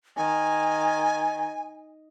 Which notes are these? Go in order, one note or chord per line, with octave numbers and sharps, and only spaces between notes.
D#3 G#5